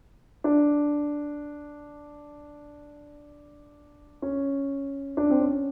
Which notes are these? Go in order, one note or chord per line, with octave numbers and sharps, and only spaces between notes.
D4
C#4
D4
C4
C#4